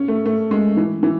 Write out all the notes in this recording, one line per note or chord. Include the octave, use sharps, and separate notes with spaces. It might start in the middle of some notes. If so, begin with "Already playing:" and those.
Already playing: C#4
A3
A3
G#3
E3
E3